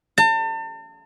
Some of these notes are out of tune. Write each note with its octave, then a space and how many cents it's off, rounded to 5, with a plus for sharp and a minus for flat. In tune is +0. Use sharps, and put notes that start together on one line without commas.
A5 +40